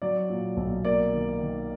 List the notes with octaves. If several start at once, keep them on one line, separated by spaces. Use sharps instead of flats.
F#3 D5
A#2
B1
A#3 D5
D#3
D#3